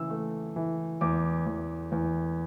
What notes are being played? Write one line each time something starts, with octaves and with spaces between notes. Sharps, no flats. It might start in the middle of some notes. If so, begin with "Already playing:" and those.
Already playing: C#3 E3 E6
A3
E3
E2 D6
E2
E2